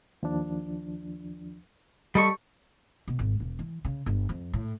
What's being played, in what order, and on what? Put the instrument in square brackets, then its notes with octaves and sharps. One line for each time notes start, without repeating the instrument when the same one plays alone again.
[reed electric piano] D#2 F3 D4
[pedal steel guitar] G3 A4 C#6 [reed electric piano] D#5
[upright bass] B2
G#1
E1
E3
C#3
G1
F2
A2